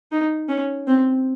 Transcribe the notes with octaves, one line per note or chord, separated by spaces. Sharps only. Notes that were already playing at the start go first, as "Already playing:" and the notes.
D#4
C#4
C4